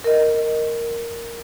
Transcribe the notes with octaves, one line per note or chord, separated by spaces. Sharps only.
A#4 D#5